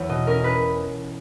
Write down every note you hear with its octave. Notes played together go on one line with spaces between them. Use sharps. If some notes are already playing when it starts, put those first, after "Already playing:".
Already playing: E2 C#5
B2 D#5
C#4 A#4
C#4 B4